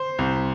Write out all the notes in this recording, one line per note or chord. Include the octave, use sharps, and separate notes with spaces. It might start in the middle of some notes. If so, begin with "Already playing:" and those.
Already playing: C5
C2